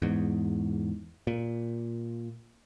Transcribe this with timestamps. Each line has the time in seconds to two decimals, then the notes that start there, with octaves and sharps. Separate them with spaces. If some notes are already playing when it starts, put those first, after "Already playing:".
0.02 E2 G#2
1.27 A#2